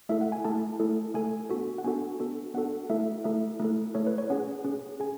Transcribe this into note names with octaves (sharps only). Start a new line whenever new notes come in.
A3 E4 A4 E5
F#5
G#5
A3 E4 A4 A5
A3 E4 A4
A3 E4 A4 G#5
B3 D4 F#4 A4
F#5
B3 D4 F#4 A4 G#5
B3 D4 F#4 A4
B3 D4 F#4 A4 F#5
A3 E4 A4 E5
A3 E4 A4 E5
A3 E4 A4
A3 E4 A4 C#5
B4
C#5
C#4 G#4 F#5
C#4 G#4
G#4 G#5